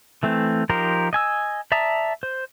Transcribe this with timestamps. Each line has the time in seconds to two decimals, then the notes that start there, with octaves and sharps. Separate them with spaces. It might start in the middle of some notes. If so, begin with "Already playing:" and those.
0.23 E3 A3 C4
0.69 F3 D#4 G4 A#4 C5
1.13 D#5 G#5 E6
1.72 D5 E5 A5 A#5 D#6
2.23 C5